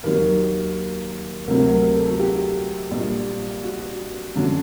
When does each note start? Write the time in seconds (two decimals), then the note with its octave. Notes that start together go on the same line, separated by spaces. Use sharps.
0.03 D#2 D#3 F#3 A#4
1.47 D2 C3 F#3 A#4
1.71 A#4
1.95 A4
2.08 F#4
2.19 G4
2.91 A#1 A#2 G3
3.63 F#4
4.36 F#2 D3 F#3